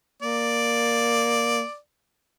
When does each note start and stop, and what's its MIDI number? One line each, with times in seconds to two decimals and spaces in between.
0.22 1.63 58
0.22 1.77 74